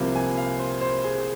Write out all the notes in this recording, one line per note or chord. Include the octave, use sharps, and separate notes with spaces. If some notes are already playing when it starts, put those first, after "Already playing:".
Already playing: C2 C3 F3 A#3
G#5
F5
C5
C5
G#4
G#4